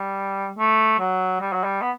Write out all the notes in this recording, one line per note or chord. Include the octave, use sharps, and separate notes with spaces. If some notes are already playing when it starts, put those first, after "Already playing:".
Already playing: G3
A3
F#3
G3
F#3
G3
B3